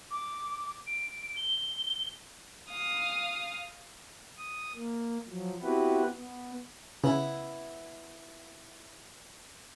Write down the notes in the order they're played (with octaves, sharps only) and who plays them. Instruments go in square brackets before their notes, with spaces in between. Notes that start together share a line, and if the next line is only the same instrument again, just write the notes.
[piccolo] D6
D7
G7
[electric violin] F5 D#6
[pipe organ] D#6
A#3
F3 F#3
B3 C4 E4 F#4 G4 B4
B3
[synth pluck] C#3 [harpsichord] B3 E4